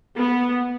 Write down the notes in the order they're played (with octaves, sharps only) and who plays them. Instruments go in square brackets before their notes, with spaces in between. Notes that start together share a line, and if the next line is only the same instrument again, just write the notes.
[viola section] B3